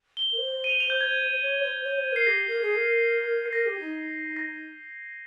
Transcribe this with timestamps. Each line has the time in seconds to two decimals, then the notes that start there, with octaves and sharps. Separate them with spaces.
0.17 G7
0.32 A#4
0.38 C5
0.64 D#7
0.70 F7
0.80 F7
0.90 G6
1.01 G#6
1.42 C#5
1.63 C5
1.84 C#5
1.98 C5
2.12 A#4 C7
2.27 G4 A#6
2.48 A#4
2.62 G#4
2.76 A#4
3.46 C7
3.52 A#4 A#6
3.66 G4
3.80 D#4
4.37 A#6